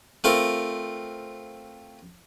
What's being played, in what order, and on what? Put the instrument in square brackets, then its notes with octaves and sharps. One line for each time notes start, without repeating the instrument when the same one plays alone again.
[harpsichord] A3 C4 F4 A#4